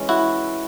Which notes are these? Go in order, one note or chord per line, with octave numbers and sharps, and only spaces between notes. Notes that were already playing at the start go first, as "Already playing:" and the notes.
Already playing: E3 G#3 C#4
E4 F#4